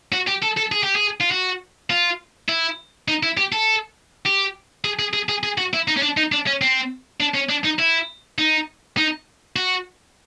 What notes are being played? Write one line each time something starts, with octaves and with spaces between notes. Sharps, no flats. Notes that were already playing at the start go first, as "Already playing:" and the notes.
F#4
G4
A4
A4
G#4
G4
G#4
F4
F#4
F4
E4
D#4
E4
G4
A4
G4
G#4
G#4
G#4
G#4
G#4
F#4
E4
D#4
C#4
D4
D#4
D4
C#4
C4
D4
C#4
D4
D#4
E4
D#4
D#4
F#4